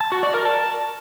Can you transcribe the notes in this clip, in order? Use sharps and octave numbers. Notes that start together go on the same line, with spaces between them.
A5
F#4
D5
A#4
A5